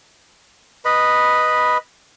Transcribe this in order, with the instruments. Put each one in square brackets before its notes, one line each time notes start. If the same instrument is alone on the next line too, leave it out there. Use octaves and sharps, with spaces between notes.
[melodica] B4 D#5 B5